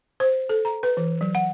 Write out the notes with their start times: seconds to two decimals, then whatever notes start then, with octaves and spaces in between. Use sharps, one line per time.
0.20 C5
0.49 A4
0.65 A#5
0.83 B4
0.97 E3
1.21 F#3
1.35 F#5